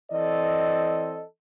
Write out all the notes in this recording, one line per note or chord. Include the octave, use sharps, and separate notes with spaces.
E3 C4 A4 D5 D#5